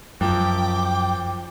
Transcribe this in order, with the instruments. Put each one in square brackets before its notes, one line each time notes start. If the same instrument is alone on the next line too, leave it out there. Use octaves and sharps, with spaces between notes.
[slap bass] F#2 [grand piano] F3 [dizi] G5 [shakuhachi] D6